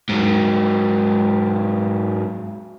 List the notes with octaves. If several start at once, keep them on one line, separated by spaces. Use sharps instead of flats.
G#2 F#3